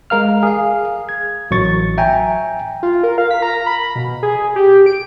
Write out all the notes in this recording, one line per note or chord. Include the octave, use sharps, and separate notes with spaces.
G#3 A#4 F5 F6
G#4 F5
G#6
A1 F#3 C#6 A6
E5 G5 G#5 A#5
F4
A#4
F5
B6
A#5
B5
B2
G#4
G4
D7